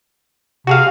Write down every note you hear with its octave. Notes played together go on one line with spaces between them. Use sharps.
C3 F#4 G#4 F5